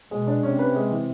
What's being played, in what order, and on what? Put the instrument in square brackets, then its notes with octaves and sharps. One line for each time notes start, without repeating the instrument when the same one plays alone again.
[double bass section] B2 [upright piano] G#3
[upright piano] D4
[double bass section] C3 [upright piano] C#4
[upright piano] B4
G#3
E3